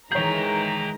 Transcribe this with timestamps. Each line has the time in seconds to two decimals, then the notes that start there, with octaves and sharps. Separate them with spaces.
0.12 D#3 E3 G#3 G#4 C#5 G5 A#5 G6